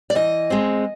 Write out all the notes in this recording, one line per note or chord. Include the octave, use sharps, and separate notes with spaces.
D5
E3 D#5
G#3 C4